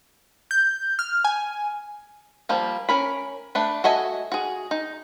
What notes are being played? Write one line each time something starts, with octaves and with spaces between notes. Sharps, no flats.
G6
F6
G#5
F3 G3 A#3
C#4 A#4 B5
A3 D4 B4
F#4 A4 D#5 E5 G#5
F#4 G#4
D#4